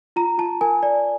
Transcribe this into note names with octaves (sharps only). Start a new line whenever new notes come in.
F4 A#5
F4 A5
A#4 G#5
D5